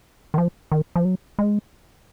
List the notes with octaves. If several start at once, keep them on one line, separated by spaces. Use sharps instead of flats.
D#3
F3
D#3
F3
F#3
G#3